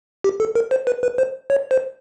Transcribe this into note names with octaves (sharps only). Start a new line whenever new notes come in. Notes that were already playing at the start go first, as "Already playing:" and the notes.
G4
A4
A#4
C5
B4
B4
C5
C#5
C5